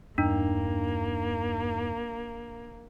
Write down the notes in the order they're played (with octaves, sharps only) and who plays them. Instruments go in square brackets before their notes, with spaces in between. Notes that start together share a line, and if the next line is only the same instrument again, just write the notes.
[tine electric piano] E2 G2 D#4 [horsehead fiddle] A#3 [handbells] D4